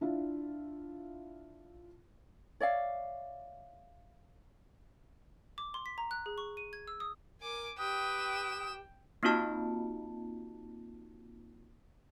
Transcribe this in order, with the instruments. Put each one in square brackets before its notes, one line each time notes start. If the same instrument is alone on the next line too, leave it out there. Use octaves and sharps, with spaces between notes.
[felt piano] D4 E4 F4
[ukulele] C#5 D5 E5 F5
[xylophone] D6
C6
B6
A#5
F#6
G#4
C#6
D#7
G#6
E6
D#6
[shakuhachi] A#4 [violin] G#5 D6
[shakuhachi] G4 [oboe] B4 [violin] G5 E7 [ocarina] D#6
[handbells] A#3 C4 D#4 F4 F#4 A5